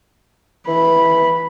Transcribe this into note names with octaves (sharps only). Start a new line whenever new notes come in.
E3 B5